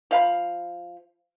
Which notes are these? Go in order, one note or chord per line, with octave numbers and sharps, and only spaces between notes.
F3 F5 B5